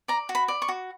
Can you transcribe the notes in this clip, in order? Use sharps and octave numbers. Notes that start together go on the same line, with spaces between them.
D5 A#5
F#4
B5
D5
C#6
F#4